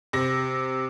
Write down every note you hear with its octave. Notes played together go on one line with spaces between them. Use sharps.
C3 A#6